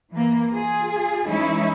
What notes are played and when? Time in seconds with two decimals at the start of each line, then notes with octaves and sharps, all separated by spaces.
0.14 E3 A#3
0.54 F4 G#4
1.28 E3 G#3 C#4 D#4 E4